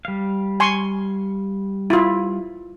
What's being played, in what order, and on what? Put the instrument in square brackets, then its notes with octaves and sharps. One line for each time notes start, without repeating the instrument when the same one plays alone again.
[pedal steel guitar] G3 F5
[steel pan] G#5 C6 C#6
E4 F4